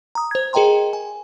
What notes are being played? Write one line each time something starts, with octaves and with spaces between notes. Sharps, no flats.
A#5 D#6
C5 G#6
G#4 A#4 D#5 G5 A#5 C6
G#5